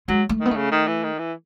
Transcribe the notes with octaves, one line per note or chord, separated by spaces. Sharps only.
F#3 G#3
A3
D#3
B3
A3
C#3
D#3
E3
D#3
E3